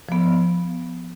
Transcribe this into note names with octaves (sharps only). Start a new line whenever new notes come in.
F3 B3